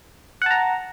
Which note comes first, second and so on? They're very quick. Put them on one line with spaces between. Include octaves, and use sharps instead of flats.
F#5 A5 A#5